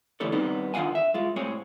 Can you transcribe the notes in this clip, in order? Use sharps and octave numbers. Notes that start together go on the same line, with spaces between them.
D3 E3 A3 C#4 A4 C#5
D#3 G3 B3 C4 D#4
D3 D#3 F4 F5 F#5 G#5
E5
G#3 F4
A2 G#3 C4 G#4 C#5